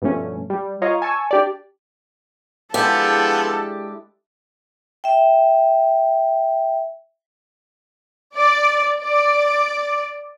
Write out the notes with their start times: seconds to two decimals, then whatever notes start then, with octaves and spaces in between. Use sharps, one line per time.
0.02 G2 B2 F3 A3 C#4
0.50 G3
0.82 F4 C#5 D#5 F5 A#5
1.02 G#5 A5 C#6 E6
1.31 D4 G4 D5
2.74 F3 G#3 B3 D4 E4 G4 A4 F5
5.04 E5 G5
8.34 D5
9.01 D5